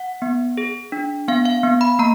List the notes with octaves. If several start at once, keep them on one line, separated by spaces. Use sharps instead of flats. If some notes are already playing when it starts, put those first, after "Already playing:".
Already playing: F#5
B3
G#4
D4
B3 F5
F5
B3
B5
A#3 A#5